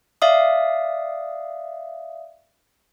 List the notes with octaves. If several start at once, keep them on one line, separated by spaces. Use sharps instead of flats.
D5 E5 F5 D#6